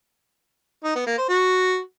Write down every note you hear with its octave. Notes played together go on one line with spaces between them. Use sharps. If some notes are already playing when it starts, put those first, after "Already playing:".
D#4
B3
A#3
C5
F#4